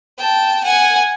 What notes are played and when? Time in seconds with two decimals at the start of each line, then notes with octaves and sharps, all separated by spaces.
0.18 G5 A5
0.64 F#5 G#5